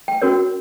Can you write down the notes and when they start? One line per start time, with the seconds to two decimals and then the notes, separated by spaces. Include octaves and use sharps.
0.08 G5
0.22 C#4 F#4 A#4 C#5